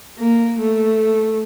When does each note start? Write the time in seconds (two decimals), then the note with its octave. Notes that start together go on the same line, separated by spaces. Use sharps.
0.19 A#3
0.60 A3